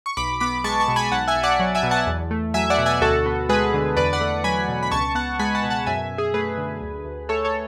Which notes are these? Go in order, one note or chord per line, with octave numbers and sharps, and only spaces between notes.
C#6
B1 B5 D6
B3 B5 D6
G#3 A5 C#6
A5 C#6
B2
G#5 B5
B1 F#5 A5
E5 G#5
B1
D5 F#5
F#3
E5 G#5
B2
F#5 A5
E2
A3
F#3 E5 G#5
D5 F#5
B2
E5 G#5
D2 F#4 A4
B3
G#3 G#4 B4
D3
E2 B4 D5
D5 F#5
A3
F#3 G#5 B5
B2
B5
C#2 A5 C#6
B3 F#5 A5
G#3 G#5 B5
F#5 A5
B2
F#5 A5
F#2 E5 G#5
F#2
G#4
A3 G#4 B4
D3
D2
D2
A3 A4 C#5
A4 C#5